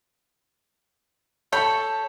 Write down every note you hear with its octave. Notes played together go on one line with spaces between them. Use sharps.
A4 C#5 A5 B5 G6